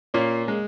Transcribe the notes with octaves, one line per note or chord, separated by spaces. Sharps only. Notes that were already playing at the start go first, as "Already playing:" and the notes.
A#2 A#3 C#4
G#3